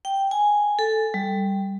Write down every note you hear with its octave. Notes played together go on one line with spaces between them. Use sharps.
G5
G#5
A4
G3